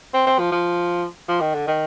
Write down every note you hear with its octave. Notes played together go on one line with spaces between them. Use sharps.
C4
C4
F3
F3
F3
D#3
D3
D#3